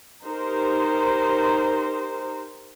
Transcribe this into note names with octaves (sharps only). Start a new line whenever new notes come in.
D#4 G4 A#4 C5